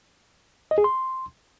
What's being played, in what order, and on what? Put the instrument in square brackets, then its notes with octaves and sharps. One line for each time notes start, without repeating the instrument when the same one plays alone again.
[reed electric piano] D#5
G#4
C6